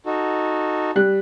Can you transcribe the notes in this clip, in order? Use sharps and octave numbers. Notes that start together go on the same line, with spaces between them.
D#4 F#4 A4
G3 F#6